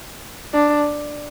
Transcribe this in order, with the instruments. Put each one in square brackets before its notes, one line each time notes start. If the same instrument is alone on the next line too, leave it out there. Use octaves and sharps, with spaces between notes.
[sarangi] D4